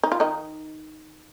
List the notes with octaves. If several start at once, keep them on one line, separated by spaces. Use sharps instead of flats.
D#4
F4
D#3 D#4